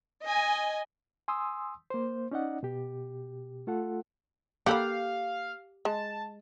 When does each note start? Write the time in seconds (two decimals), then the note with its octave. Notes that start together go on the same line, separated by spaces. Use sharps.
0.24 D#5 G#5
1.28 G#5 C6 D#6 E6
1.90 A#3 C5
2.31 C#4 D#4 D5 D#5 F#5
2.63 B2 G4
3.67 A3 F4 A4 F#5
4.66 A#3 G4 A4 F5 F#5 B5
5.85 G#3 A5